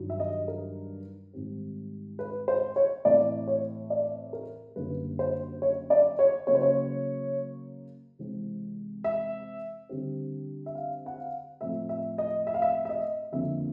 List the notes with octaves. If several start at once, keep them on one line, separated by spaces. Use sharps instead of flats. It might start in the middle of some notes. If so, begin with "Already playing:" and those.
Already playing: G2 D#3 F#3
E5
D#5
A#4
G#2 D#3 G3 C4
B4
C5
C#5
A2 E3 A3 C4 D5
C#5
D5
A#4
F#2 D3 G3 A#3 B4
C5
C#5
D5
C#5
C#3 F#3 A#3 C#5
C5
C#5
C3 E3 G#3 C4
E5
D3 G3 C4
E5
F5
F#5
F5
A2 F3 A3 C4 E5
E5
D#5
E5
F5
E5
E5
D#5
F2 D3 F3 A#3 E5